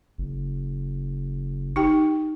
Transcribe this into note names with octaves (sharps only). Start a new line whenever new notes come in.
F#1
D#4 G4 G5